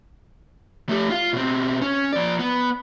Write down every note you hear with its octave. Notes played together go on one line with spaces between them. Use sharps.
A3 G4
F4 F5
B2 C4
C#4
F3 D5
B3